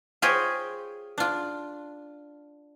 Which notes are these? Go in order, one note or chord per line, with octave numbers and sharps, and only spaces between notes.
F4 G4 G#4 C5 C#5 D#5
D4 F4